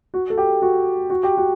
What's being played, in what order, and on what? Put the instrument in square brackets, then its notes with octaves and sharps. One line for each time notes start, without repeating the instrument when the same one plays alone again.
[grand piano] F#4
A4
G4
F#4
F#4
G4
F#4